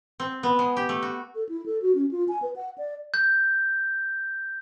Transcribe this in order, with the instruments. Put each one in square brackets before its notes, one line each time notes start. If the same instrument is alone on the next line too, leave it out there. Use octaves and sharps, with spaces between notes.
[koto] C4
B3
G#3
G4
A3
F#4
[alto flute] A4
E4
A4
F#4
C#4
F4
G#5
B4
F#5
D5
[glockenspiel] G6